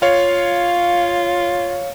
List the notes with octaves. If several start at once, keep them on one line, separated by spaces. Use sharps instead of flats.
F4 C#5 F5